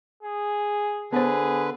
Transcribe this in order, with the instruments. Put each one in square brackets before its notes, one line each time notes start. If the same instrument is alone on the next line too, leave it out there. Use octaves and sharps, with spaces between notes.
[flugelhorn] G#4
[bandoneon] D3 B4 [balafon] B3 C5 [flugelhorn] G#4